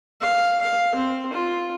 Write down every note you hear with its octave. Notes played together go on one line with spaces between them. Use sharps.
F5
F5
C4
F4